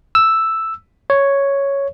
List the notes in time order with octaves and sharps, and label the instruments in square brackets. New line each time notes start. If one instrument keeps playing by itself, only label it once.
[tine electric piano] E6
C#5